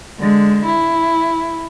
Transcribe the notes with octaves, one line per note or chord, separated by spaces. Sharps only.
D3 G#3
E4